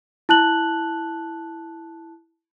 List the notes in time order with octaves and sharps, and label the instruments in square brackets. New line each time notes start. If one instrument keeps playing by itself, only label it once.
[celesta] E4 A5 F#6 F#7